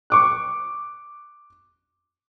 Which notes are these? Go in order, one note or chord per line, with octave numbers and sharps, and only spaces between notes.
C#6 D6 F#6